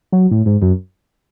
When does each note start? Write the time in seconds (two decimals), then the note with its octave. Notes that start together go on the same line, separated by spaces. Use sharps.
0.12 F#3
0.31 A2
0.46 G#2
0.62 F#2